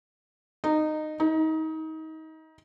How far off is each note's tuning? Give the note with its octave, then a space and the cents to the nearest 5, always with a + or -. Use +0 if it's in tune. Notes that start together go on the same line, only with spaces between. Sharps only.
D#4 -15
D#4 +30